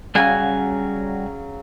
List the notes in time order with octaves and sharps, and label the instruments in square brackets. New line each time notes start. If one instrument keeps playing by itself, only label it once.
[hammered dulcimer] C#3 F#3 [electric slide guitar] G3 F#4 G#5